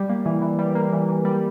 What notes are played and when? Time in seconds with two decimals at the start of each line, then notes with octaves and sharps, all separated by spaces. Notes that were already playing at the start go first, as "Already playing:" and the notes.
Already playing: G3
0.10 A#3
0.26 E3
0.42 E3
0.59 G3
0.75 A#3
0.93 E3
1.09 E3
1.25 G3